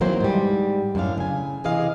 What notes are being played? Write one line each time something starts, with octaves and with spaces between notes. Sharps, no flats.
D#3 E3 F#3 A#3 C4 C5
G#2 G3
F#2 A2 D4 F5
C#3 G#5
C3 E3 G#4 D#5 F5